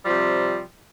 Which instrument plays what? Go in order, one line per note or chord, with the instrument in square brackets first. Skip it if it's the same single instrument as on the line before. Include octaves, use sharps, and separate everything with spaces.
[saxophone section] C3 F3 G3